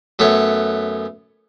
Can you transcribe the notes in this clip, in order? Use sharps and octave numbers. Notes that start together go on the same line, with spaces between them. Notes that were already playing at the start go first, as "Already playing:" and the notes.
F#2 A3 B3 C#5